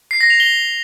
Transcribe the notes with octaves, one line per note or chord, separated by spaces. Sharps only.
C7
A#6
F7
G7